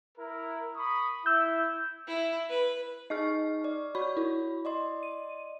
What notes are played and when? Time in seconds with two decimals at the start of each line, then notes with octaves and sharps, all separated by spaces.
0.18 E4 A#4
0.77 B5 C#6 D#6
1.26 E4 E6 G6
2.07 E4
2.49 B4
3.10 D#4 G#4 D#5 C#6 F6
3.64 D5
3.95 F#4 C#5 B5 C#6
4.17 E4
4.65 D5 D#5 C6
5.03 D#7